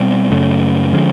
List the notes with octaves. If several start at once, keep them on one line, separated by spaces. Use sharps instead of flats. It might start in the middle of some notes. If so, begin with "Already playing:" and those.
Already playing: B2 G3 C4
F#2 C#3 F#3 A3
D3 F3 G#3 C#4